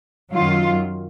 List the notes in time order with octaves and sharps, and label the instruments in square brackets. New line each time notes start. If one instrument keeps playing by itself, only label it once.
[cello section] F#2 D#3 F#3 F4